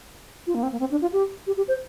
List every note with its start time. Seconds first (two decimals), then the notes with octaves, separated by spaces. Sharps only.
0.47 F4
0.55 A#3
0.63 C4
0.72 A#3
0.80 C4
0.91 D4
1.02 F4
1.13 G4
1.47 G4
1.57 G4
1.68 C5